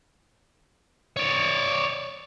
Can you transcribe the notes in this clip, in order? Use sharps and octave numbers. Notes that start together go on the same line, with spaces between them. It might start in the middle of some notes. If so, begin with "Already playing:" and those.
C#5 D5